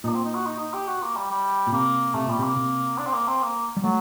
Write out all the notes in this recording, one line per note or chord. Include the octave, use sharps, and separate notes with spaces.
A#2 A#3 D#4
C4
D#4
F#4
D#4
D#4
G4
F#4
A#3
G3
G3
A#2
C3 A#3
C3 A3
A#2 G3
C3 A#3
C3
D4
C4
A#3
C4
A#3
G3
F#3 A3